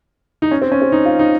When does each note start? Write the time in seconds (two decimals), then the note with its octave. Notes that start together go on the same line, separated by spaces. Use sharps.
0.42 D#4
0.51 C#4
0.62 C4
0.72 C#4
0.82 C4
0.92 D#4
1.05 F4
1.19 D#4